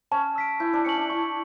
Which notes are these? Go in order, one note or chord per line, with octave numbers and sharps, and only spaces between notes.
C#4 A5
E6 B6 D7
E4 G6
D4
C#4 C#7 F#7
D4
E4 C#6